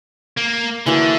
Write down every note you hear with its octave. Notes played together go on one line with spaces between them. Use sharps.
A#3
D3 E3 F#3 A#3